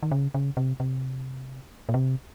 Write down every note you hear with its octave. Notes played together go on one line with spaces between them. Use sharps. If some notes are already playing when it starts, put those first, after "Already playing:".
D#3
C#3
C#3
C3
C3
A#2
C3